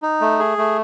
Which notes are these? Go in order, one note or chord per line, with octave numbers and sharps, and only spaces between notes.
D#4
A3
G#4
A3